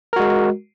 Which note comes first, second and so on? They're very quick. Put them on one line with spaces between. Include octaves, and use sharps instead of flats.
A#4 F#4 G#3